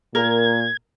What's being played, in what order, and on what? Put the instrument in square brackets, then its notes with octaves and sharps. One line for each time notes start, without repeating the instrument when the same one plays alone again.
[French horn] A#2 [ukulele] A#4 [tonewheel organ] G#6